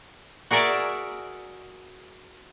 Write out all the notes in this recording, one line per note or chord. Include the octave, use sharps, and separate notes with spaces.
F#4 G#4 A#4 D5 E5